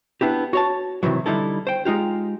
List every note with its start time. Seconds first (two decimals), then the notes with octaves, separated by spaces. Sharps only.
0.21 B3 D4 E4 G4
0.53 F#4 C#5 A5
1.03 C3 D#3 E3 F#3
1.26 D3 G3 D#4 E4 A4
1.67 C5 G5
1.85 G#3 D#4 F4 G4